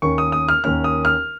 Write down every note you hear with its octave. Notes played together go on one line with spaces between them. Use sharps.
D#2 D#3 A#3 C#4 C#6
D#6
D#6
F6
D#2 D#3 A#3 C#4 F6
D#6
F6